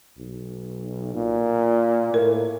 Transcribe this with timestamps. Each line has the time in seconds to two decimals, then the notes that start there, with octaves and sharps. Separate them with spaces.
0.19 B1
1.15 A#2
2.14 A2 A#4